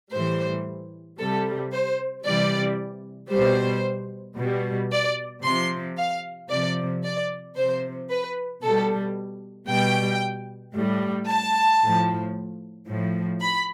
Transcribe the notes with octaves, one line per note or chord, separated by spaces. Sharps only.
A2 E3 G3 C5
C3 G3 A4
C5
C3 E3 G3 D5
B2 G3 C5
B2 G3
D5
C3 F3 C6
F5
C3 F3 D5
D5
C3 F3 C5
B4
B2 G3 A4
B2 G3 G5
A2 G3
A5
A2 F3
A2 F3
B5